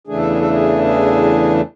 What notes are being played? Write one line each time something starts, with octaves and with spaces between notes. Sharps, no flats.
E2 C#3 E3 A3 D4 G#4
A4
G#4
A4
G#4
G#4